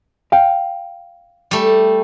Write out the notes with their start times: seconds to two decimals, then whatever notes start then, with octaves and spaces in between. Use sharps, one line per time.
0.32 F5 G5
1.51 G3 A3